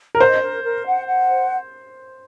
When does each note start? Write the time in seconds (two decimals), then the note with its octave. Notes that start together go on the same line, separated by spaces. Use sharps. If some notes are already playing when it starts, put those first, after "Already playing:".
0.15 A#4
0.20 C5 D#5
0.41 A#4
0.64 A#4
0.85 F#5
1.07 F#5
1.29 C5